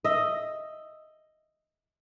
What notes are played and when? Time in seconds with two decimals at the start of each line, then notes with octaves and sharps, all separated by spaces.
0.04 D#5 E5